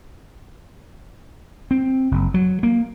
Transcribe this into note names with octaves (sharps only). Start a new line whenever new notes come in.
C4
F#1
F#3
A#3